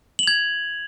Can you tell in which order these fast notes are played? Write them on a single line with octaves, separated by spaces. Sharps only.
F#7 F7 G#6